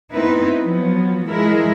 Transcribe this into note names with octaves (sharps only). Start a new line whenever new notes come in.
B3 C4 D#4 E4 B4
F3 F#3 B3
E3 F3 G#3 E4 A#4 E5